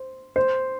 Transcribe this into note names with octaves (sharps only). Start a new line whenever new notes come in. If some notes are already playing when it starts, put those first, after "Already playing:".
Already playing: C5
C5